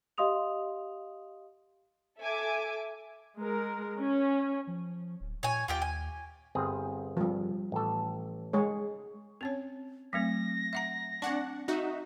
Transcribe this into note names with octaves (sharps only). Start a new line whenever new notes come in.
G4 D#5 F5 C6 D#6 F7
A4 E5 G#5 D6
G#3 A#4
C#4
F3
D1
A#2 C#5 G#5
D#2 F4 G4 G5
G#5
G1 C4 G#4
F3 G3
A1 A4
G#3 G#4 C#5
C4 C#4 C#5
F#3 A3 C4 A#6
E5 F#5 A#5
C4 D4 F#5 C#6
D#4 F#4 E5